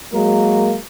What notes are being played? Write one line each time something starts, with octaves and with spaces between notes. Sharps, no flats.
F#3 G#3 A#3 A#4